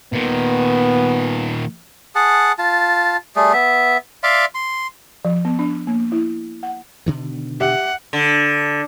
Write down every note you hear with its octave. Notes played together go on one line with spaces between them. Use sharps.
A#2 D#3 B3
G#4 F#5 A5
F4 A5
G3 A3 G#4
B3 E5
D5 E5 F5 C6
C6
F3
B3
D4
A#3
E4
F#5
B2 D3 D#3
G4 E5 F#5
D3